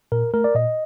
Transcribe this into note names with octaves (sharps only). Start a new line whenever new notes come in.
A#2 A#4
A3 A#4
D5
A#2 D#5